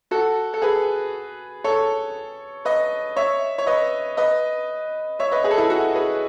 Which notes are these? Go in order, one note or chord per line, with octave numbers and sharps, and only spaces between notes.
F#4 A4
A4
G#4 B4
A4 C#5
B4 D#5
C#5 E5
C#5
B4 D#5
B4 D#5
C#5 E5
B4 D#5
G#4 B4
A4
E4 G#4
F#4 A4
G#4 B4